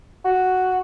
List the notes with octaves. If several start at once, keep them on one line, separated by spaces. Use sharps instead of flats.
F#4